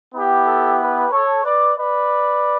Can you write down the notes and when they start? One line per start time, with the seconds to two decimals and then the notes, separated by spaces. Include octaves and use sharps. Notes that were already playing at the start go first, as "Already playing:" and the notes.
0.15 B3 E4 G4
0.47 A4
0.80 G4 B4
1.11 A4 C#5
1.44 B4 D5
1.77 B4 D5